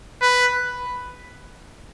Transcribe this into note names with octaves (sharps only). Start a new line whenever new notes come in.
B4